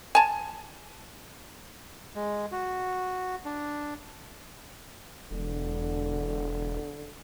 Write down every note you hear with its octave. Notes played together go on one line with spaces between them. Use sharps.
G#5 A5
G#3
F#4
D4
E1 D3